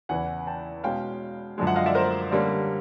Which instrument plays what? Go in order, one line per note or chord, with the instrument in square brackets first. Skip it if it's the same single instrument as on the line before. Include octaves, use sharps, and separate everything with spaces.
[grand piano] E2 C#3 E3 F#5 G#5
G5 A5
B2 G#3 C#4 F5 G5
F#2 D3 F3 G#3
E5 F#5
D#5 F5
D5 E5
A#4 C5
D3 G3 A#3 C#4